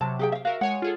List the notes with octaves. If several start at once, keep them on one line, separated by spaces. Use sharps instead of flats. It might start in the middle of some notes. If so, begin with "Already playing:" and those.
C3 F#3 A5
G4 G#4 G5
E5 F5
F#4 A#4 E5 F5
G#3 C#5 F#5 G#5
F4 G#4 A4